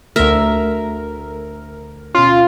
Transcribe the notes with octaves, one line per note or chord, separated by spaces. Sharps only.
D2 A3 A#4 E5
B2 C#4 F4